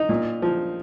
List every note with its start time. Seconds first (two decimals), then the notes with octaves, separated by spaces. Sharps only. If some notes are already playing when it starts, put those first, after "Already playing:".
Already playing: D#4
0.09 A#2
0.42 F3